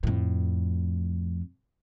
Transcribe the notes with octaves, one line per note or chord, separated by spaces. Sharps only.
F2 A2